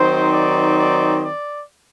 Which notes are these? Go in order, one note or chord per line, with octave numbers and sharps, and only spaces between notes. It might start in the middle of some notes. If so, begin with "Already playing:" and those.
Already playing: D#3 F#3 C4 D#4 C5
D5
D5
D5